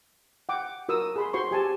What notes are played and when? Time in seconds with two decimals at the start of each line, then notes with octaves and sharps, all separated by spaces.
0.49 F#5 G5 D6
0.89 F#4 A#4 D#6 E6
1.16 G#4 B5 C6
1.33 F#4 C5 C6 C#6
1.51 G4 G#5 A5